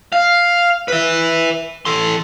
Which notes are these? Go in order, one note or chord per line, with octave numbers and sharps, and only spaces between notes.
F5
B4 E5
A4 C6